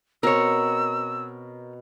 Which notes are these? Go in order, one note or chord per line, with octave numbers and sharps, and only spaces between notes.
B2 C4 A#4 C#5 A#5 E6